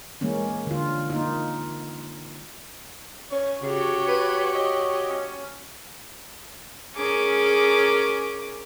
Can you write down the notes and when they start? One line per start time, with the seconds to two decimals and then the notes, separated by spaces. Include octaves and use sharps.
0.21 E3 G#3 A#3 C#4
0.67 D3 F4
1.10 A#3 D#4 F4
3.32 C#4 C#5
3.62 C#3 F#4 G4
4.08 B4
4.55 C#5 D#5
5.10 C#4
6.96 C#4 G#4 A#4 D6